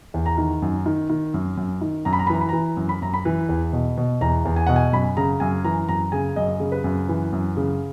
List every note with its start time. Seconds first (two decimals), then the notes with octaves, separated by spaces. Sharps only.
0.14 E2
0.26 A#5
0.38 D#3
0.62 F#2
0.86 D#3
1.10 D#3
1.34 F#2
1.57 F#2
1.81 D#3
2.05 F#2 A#5
2.13 B5
2.19 A#5
2.27 B5
2.30 E3 A#5
2.41 B5
2.49 E3 A#5
2.77 F#2
2.89 B5
3.02 F#2 A#5
3.14 B5
3.25 E3
3.49 E2
3.73 B2
3.97 B2
4.21 E2 A#5
4.45 E2
4.56 G#5
4.67 B2 F#5
4.76 G#5
4.93 F#2 B5
5.17 C#3 A#5
5.40 F#2 G#5
5.64 E3 A#5
5.88 F#2 A#5
6.12 C#3 G#5
6.36 F#2 D#5
6.60 C#3
6.72 B4
6.84 F#2
7.09 E3
7.32 F#2
7.57 C#3